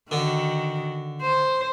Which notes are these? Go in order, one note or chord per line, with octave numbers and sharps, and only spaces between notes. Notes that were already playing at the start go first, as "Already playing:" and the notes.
D3 D#3 F#4
C5